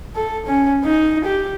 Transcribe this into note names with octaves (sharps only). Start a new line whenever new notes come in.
A4
C#4
D#4
G4